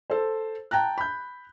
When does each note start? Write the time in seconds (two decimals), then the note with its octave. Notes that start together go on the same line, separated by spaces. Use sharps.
0.10 A4 C5
0.71 G5 A5 A#5 F#6
0.98 B5 G6